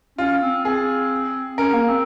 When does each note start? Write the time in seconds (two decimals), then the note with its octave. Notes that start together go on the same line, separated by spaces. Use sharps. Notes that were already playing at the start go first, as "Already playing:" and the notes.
0.18 C#4 F4
0.42 C4
0.65 C4 G#4
1.58 C#4 A#4
1.74 A#3
1.89 C4